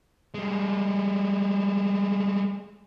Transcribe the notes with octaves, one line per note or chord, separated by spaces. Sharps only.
G3 G#3